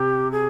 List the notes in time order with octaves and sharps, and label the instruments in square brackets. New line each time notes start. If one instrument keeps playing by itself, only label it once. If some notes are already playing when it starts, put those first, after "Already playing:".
Already playing: [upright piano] C3 [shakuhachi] G4
[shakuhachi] G#4